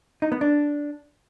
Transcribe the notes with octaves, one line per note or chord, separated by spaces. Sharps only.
D#4
B3
D4